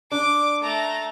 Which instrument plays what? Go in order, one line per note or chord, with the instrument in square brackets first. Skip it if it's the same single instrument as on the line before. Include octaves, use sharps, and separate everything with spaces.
[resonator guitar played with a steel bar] D4 [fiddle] D6
[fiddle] A3 A#5